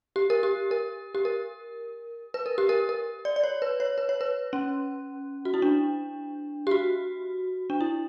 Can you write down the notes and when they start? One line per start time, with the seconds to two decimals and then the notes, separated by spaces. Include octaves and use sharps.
0.16 G4
0.30 A#4
0.43 G4
0.71 A#4
1.15 G4
1.25 A#4
2.34 B4
2.46 A#4
2.58 G4
2.69 A#4
2.89 A#4
3.25 D5
3.36 D5
3.44 C#5
3.62 B4
3.80 C#5
3.98 B4
4.09 C#5
4.21 B4
4.53 C#4
5.45 F#4
5.54 E4
5.62 D4
6.67 G4
6.71 F#4
7.70 D4
7.81 E4